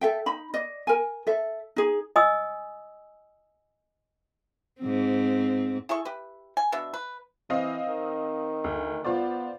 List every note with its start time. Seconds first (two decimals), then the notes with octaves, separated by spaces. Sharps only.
0.01 A4 E5 G5
0.26 D#4 B5
0.54 D5 D#5
0.87 A#4 G#5
1.27 A4 E5
1.76 D#4 G#4
2.16 D#5 G#5 D#6 E6
4.81 G#2 C4
5.89 E4 G#4 A4 C#6
6.05 G4 B4
6.57 G#5
6.72 B2 B3 D4 E5
6.94 B4
7.50 E3 C4 D#5 F5
7.88 D#3
8.64 D2
9.04 B3 F4 C5 D5